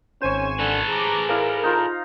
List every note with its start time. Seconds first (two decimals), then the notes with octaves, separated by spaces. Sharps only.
0.21 G#1 C#4 C5 G#5 C#6 E7
0.59 D3 A4 B4
0.90 G#4 A#5 D6
1.29 E4 A#4 D5 F5
1.63 D#4 F4 A#5